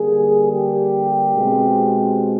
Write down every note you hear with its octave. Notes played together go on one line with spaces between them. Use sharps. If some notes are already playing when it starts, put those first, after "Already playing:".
Already playing: D3 G3 A#3 G#4
G4
B2 G#3 C4